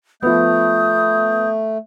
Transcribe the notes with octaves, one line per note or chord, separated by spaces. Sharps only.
F3 A3 B3 D#6 G6